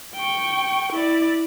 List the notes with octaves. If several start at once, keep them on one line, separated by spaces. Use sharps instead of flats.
G5 C#6
E4 D5